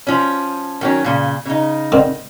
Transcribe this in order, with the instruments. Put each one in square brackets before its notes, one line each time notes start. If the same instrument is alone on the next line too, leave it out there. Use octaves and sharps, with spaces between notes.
[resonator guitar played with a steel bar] F3 C#4
D#3 F#3 C#4
A#2 C#3
C#3 D#4
[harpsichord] D3 D#3 C4